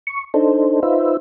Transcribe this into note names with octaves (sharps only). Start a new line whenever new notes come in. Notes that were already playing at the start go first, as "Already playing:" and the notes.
C#6
D4 D#4 A4 C5
D#4 F4 B4 C5 E5